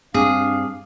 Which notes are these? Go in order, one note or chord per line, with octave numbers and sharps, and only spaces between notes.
G2 C4 D4 G#4 F5